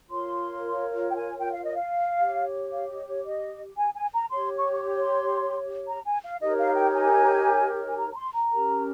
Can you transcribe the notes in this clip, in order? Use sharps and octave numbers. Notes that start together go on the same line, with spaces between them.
F4 A#4 C#5 C6
G5
G#5
G5
F5
D#5
F5
G4 C#5
F5
D#5
C#5
D#5
G#5
G#5
A#5
G4 C#5 C6
C#6
C#6
C6
A#5
G#5
F5
D#4 G4 A#4 C#5 D#5
F5
G5
G#5
G#5
A#5
A#5
C6
A#5
C#4 G4 A#4